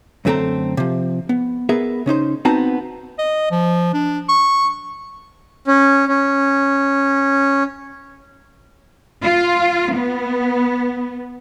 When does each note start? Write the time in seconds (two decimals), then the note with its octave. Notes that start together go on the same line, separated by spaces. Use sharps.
0.25 F#2 D3 A3 C4 A4 A#5
0.77 C3 F3
1.29 B3
1.69 B3 G#4 A#4 B4 E5
2.06 C#3 C#4 D#4 C5
2.45 B3 C4 D#4 F#4 A5 A#5
3.18 D#5
3.51 F3
3.93 D4
4.29 C#6
5.67 C#4
6.08 C#4
9.23 F4
9.94 B3